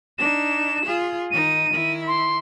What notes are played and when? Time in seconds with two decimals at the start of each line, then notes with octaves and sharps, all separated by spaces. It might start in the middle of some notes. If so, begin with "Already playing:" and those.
0.18 D4 D#4 E7
0.86 F4 G#4
1.31 D#3 D#4 D#7
1.70 D#3 E4
2.07 C6